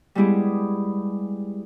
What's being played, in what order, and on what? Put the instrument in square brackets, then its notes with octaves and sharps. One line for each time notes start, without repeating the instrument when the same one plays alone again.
[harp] G3 G#3 B3 E4 G4 G#4